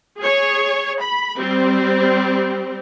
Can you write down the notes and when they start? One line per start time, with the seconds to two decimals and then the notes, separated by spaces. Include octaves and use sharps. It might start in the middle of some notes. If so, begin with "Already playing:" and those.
0.19 G#4 C#5
1.00 B5
1.37 G3 C4